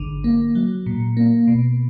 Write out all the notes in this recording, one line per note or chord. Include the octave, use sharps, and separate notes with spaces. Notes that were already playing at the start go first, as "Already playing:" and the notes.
Already playing: G#1 D3
A#3
F#3
A#2
A#3
B2